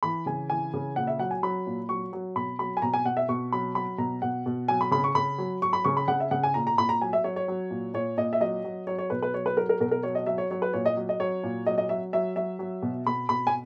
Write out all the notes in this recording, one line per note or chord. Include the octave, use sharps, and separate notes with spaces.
E3 B5
C#3 G#5
E3 G#5
C#3
A#2 F#5
E5
F#3 F#5
G#5
F#3 B5
A#2
F#3 C#6
F#3
B2 B5
F#3 B5
G#5
B2 A#5
G#5
B2 F#5
E5
B2 C#6
F#3 B5
F#3 B5
B2 A#5
B2 F#5
B2
F#3 G#5
B5
C#3 B5
C#6
C#3 B5
F#3
F#3 C#6
B5
C#3 C#6
B5
C#3 F#5
E5
C#3 F#5
G#5
A#2 A#5
A#5
A#2 B5
A#5
F#3 G#5
E5
F#3 C#5
C#5
F#3
A#2
A#2 C#5
A#2 D#5
E5
F#3 D#5
F#3
F#3 C#5
C#5
B2 B4
B4
F#3 C#5
B4
F#3 A#4
A#4
B2 A#4
A#4
F#3 C#5
D#5
F#3 E5
C#5
F#3 C#5
B4
A#2 C#5
D#5
F#3
D#5
F#3 C#5
A#2
F#3 D#5
D#5
F#3 E5
F#3 E5
F#3 E5
F#3
B2
B2 B5
B2 B5
G#5